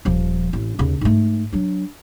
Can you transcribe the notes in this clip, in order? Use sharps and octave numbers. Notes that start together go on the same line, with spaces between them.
D#1 F3
A1 C4
D#2 C#3
G#2 A3
F#3 D4